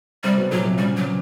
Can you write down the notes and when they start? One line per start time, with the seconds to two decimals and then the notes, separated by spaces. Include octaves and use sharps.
0.24 C3 G3 C4
0.38 B2 B3
0.51 A#2 F#3 A#3
0.65 C3 C4
0.78 C#3 G3 C#4
0.97 F#3